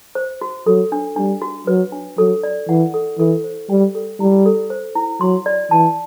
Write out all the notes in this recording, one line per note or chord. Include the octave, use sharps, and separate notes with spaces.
C5
F#4
F#3 A4
D4
G3 D4
F#4
F#3 B4
D4
F#3 A4
D5
E3 F#5
A4
E3 A4
C5
G3 G5
A4
G3 E4
A4
C5
E4
F#3 C6
D5
E3 A5